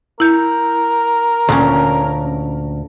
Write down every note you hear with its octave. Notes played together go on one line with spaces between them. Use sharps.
E4 A#4 G6
D2 A#2 C#4